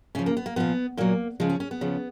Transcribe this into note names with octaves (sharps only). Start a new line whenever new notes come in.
C#3 F3 C#4
A#3
B3
A#3
A#2 F3 B3
A#2 F#3 A#3
C#3 F3 G#3
C#4
C#4
B3
C#3 F3